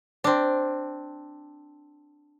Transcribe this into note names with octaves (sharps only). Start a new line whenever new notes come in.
C4 D4